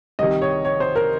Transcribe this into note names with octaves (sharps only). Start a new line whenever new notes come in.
C2 C3 D#3 D#5
C#5
C#5
C5
A#4